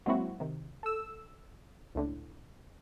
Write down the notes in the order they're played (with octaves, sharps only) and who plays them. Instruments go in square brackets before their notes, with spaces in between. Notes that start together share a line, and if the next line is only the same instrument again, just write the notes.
[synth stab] F#3 G#3 A#3 C4 E4 F#4
C3 D#3
A4 E6
C#2 A2 D3